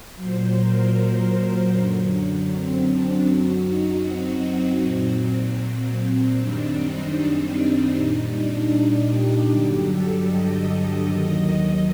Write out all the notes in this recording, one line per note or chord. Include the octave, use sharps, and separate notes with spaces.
F#3 C5
A#2
A#4
F#2 D3 F#3
C4
D4
F#2 F#3 F#4
D#4
C4
C4
A#2 F#3
F#2 D#3 G3 D4
D#4
C4
A#2 G3 D#4
D4
D#4
G4
G2 D3 F#3 G4
A4
D#5
D#2 D#3 F#3